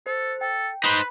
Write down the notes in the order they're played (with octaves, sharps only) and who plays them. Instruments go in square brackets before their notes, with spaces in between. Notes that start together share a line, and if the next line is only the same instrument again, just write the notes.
[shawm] A4 [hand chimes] C5
[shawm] A4 [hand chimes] G5
[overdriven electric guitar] D#4 C5 [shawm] B4 [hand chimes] B5